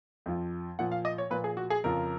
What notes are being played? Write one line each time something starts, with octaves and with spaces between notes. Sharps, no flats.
F2 F3
A#2 F3 F#5
F5
D#5
C#5
A#2 F3 B4
G#4
F#4
G#4
F2 C#3 F3 A#4